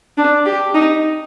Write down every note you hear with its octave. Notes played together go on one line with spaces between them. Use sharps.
D4
G4
D#4